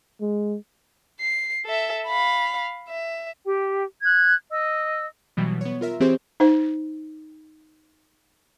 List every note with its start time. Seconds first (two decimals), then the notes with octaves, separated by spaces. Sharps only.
0.21 G#3
1.21 C7
1.66 A4 E5
2.07 F5 B5
2.89 E5
3.45 G4 G5
4.03 F#6 G#6
4.51 D#5 E6
5.37 B2 E3 F#3 G3
5.61 B3 C#5
5.81 F4 A#4 E5
6.00 E3 C4 G4 G#4 C5 C#5
6.40 D#4 C5